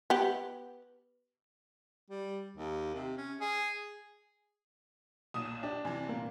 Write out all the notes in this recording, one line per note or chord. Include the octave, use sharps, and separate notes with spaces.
B3 G4
G3
D#2
C3
C#4
G#4
B1 A#2 D#6 E7
D4 G4
C3 E3 G#5
A#2 A#3